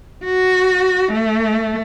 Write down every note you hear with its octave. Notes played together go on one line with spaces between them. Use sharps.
F#4
A3